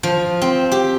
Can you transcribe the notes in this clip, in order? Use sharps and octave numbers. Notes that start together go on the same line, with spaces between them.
F3
C4
G4